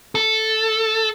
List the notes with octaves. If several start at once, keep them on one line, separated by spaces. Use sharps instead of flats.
A4